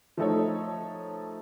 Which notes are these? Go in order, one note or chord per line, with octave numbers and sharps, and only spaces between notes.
F3 A3 D#4 A4 C#5